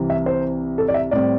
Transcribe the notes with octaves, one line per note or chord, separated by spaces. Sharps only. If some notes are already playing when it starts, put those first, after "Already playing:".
Already playing: C2 C3 E3
E5
C5
A4
D5
E5
A2 G3 C4 D5